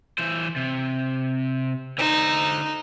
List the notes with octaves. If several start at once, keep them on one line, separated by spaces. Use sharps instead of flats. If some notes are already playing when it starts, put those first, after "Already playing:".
E3 C5
C3
D3 D#4 C5